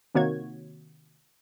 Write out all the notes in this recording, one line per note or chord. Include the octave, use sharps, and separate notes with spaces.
C3 D#3 A#3 F#4 C#5 G#6